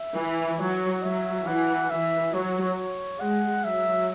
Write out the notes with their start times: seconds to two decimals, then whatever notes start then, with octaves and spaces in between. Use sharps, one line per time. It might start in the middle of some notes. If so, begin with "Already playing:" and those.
Already playing: E5
0.16 E3
0.59 F#3 C#5
1.03 F#3 E5
1.46 E3 F#5
1.90 E3 E5
2.33 F#3 C#5
3.20 G#3 F#5
3.64 F#3 E5